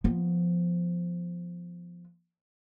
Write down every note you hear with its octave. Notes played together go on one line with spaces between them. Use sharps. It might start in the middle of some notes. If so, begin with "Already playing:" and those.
F3 B3